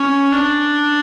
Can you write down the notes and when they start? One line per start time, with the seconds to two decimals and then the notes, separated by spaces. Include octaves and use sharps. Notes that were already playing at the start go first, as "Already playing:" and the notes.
Already playing: C#4
0.32 D4